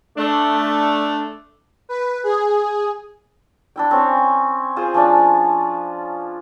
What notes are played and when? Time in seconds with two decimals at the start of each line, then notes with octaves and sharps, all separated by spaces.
0.17 A3 D4
1.89 B4
2.24 G#4
3.76 D4 E4 G5
3.91 C4 C#4 C#5
4.76 F4 G#4 C5
4.94 F3 C#4 D4 D5